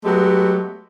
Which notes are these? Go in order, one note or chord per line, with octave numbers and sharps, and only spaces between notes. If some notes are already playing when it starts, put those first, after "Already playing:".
F#3 G#3 A3 B3 G4